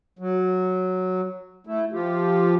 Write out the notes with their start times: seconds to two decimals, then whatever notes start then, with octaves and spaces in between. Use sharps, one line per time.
0.19 F#3
1.67 A3 E4
1.92 F3 F4 G4